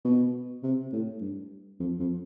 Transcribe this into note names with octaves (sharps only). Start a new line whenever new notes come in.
B2
C3
A2
G2
F2
F2